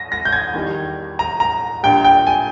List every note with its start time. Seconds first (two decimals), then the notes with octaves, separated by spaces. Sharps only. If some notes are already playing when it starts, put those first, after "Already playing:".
Already playing: A#6
0.12 A#6
0.25 G6
0.32 G#6
0.54 E2 D#3 G3
1.19 A#5
1.40 A#5
1.83 A#1 A#2 G3 G5
2.04 G5
2.27 G#5